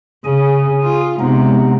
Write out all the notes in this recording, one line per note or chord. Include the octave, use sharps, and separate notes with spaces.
C#3 G#4 G#5
F4
C3 G#3 B3 D#4